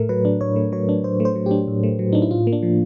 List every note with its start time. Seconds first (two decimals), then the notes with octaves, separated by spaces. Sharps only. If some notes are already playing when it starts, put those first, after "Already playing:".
Already playing: A2 A3 A#4
0.09 F#3 B4
0.25 D4
0.41 A2 C#5
0.56 A3
0.72 F#3 C#5
0.89 D4
1.04 A2 C5
1.20 A3
1.25 C5
1.36 F#3
1.46 D4 G4
1.68 A2
1.84 A3
1.99 F#3
2.13 D4 D#4
2.22 E4
2.31 A2 F4
2.47 A#3
2.53 D4
2.63 F3